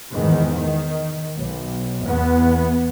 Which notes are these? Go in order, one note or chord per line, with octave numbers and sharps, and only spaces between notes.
E2 G#2 D#3
D#3
B1
E2 B3